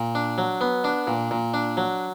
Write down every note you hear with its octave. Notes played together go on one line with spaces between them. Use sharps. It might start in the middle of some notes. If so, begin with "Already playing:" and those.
Already playing: A#2
D4
F#3
B3
D4
A#2
A#2
D4
F#3